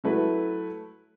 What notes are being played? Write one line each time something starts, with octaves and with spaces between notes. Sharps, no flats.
F#3 A3 E4 B4